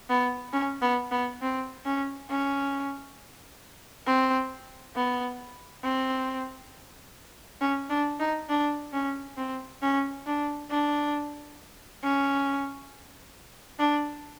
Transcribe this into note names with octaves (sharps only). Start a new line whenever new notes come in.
B3
C#4
B3
B3
C4
C#4
C#4
C4
B3
C4
C#4
D4
D#4
D4
C#4
C4
C#4
D4
D4
C#4
D4